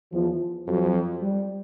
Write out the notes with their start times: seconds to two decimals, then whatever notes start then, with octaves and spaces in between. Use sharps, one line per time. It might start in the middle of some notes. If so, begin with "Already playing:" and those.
0.12 E2 F3
0.67 F2 F#3
1.21 G3